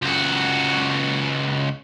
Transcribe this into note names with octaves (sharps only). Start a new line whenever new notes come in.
C#2 F#4